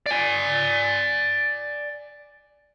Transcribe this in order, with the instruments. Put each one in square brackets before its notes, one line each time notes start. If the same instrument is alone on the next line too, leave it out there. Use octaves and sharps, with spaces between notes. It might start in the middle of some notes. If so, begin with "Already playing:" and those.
[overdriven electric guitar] D5 G#5